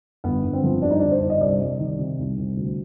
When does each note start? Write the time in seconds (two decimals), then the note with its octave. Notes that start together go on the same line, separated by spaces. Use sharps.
0.24 G1 B3
0.44 G1
0.53 C4
0.64 F3
0.82 G2 D4
0.91 D#4
0.99 G1 D4
1.12 C5
1.21 G1
1.30 D#5
1.41 C2 D5
1.60 C2
1.79 D#3
1.99 C3
2.19 C2
2.38 C2
2.57 D2